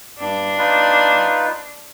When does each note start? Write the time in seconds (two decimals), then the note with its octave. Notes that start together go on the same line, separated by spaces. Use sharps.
0.19 G2 D4
0.58 D#4 F4 B4